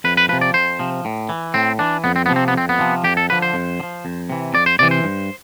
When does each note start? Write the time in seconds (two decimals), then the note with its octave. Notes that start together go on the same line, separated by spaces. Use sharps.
0.04 F2 B4
0.17 B4
0.29 F3 B4
0.33 C3
0.41 D5
0.54 F2 C5
0.79 C3 F3
1.05 A2
1.29 E3
1.54 A2 C4
1.79 E3 D4
2.04 F2 B3
2.16 C4
2.26 C3 F3 B3
2.36 C4
2.48 B3
2.54 F2 C4
2.69 B3
2.79 C3 F3
3.04 F2 G4
3.17 A4
3.30 D3 F3 B4
3.42 C5
3.54 F2
3.80 D3
3.83 F3
4.05 F2
4.30 C3 E3
4.54 F2 D5
4.66 C5
4.79 C3 E3 D5
4.91 C5
5.04 G2